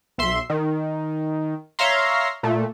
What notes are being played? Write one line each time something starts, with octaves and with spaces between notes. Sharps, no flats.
B1 E5 C6
D#3
C#5 E5 F5 A#5 C6
A#2 A3